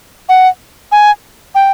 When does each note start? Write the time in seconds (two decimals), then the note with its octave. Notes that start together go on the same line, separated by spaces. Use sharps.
0.29 F#5
0.92 G#5
1.55 G5